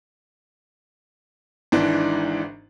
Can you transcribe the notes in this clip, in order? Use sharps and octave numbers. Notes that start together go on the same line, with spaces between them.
G#1 G#2 E3 D4